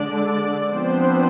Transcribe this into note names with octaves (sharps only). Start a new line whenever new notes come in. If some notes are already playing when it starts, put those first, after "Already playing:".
Already playing: D3 G#3 D4 D5
F3 B3 C4 D4 C5